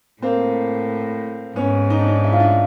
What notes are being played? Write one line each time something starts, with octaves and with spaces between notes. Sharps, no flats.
A2 A#3 C4
G#2 B3 C#4
D#4
D4
C#4 D#4
E4
F4
D4 E4